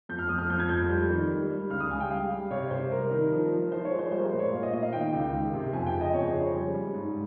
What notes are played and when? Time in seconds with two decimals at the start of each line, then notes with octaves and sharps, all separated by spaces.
0.09 F2 G6
0.19 F6
0.29 F2 D#6
0.39 F6
0.50 F2 G6
0.60 G#6
0.69 F2 G6
0.89 G3
1.10 D#3
1.30 G3
1.50 G3
1.70 C#2 F6
1.80 D#6
1.90 C#2 G#5
2.00 G5
2.10 G3 F5
2.31 G3
2.50 C3 C#5
2.71 C3 C5
2.91 G3 A#4
3.11 D#3
3.31 F3
3.52 F3
3.72 F3 C5
3.85 C#5
3.91 G#3
3.99 C5
4.12 G3 C5
4.18 A#4
4.25 C5
4.33 A#2
4.39 C#5
4.53 A#2 F5
4.63 D#5
4.73 A#2 D#5
4.82 F5
4.93 D#3 G5
5.13 C#2
5.33 D#3
5.54 C3
5.73 F2 G#5
5.87 G5
5.94 C#3
6.01 D#5
6.14 F2 C#5
6.28 C5
6.33 C#3
6.41 C#5
6.55 G3
6.74 G3
6.94 G#2